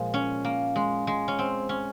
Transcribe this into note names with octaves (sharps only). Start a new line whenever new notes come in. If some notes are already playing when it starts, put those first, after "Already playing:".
Already playing: A#2 F3 G#3
C#4
A#3
G#3
G#3
C#4
C4
C#4